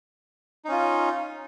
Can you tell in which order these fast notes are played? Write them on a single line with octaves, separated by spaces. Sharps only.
D#4 C#4 F4